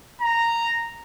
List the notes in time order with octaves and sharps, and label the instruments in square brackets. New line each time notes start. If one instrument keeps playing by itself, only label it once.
[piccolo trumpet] A#5